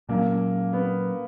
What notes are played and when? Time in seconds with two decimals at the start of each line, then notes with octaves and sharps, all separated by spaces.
0.09 A#2 F#3 A#3 C#4
0.73 B3